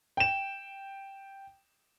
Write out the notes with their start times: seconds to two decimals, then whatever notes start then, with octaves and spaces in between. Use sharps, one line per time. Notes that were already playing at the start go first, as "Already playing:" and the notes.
0.17 G5 E7